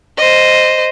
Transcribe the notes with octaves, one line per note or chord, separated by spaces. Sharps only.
C5 D#5